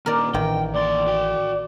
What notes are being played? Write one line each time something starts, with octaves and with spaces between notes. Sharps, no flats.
A#2 D#3 A#4 D5
A1 D#3 G5
D#2 D5 C6
F#4 G5